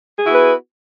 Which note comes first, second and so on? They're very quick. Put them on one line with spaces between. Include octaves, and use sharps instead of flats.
G#4 F#4 E4 B3 B4